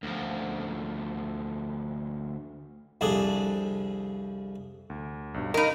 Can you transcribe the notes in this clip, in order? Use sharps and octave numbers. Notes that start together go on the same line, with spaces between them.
D2 F3
C2 F2 D4 G#4
D2
B1 G2
D#4 A#4 D#5 F5 B5